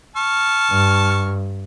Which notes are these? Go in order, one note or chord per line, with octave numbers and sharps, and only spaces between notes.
A5 C#6 F6
G2